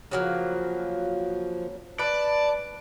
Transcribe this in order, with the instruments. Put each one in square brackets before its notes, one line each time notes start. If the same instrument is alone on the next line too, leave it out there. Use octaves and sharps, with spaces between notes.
[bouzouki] C#3 F#3 A#3 [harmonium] F3
[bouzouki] B4 [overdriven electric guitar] D5 [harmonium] A5